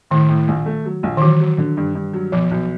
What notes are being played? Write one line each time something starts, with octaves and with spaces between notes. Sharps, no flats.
A2 D#3
A2
A#1
A3
F#3
A#1
D#3
E3 F#3
F#3
D3
G2
G2
F#3
B1 F3
B1